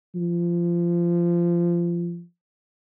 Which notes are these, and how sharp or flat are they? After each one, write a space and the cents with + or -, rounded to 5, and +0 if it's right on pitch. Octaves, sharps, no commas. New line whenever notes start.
F3 -20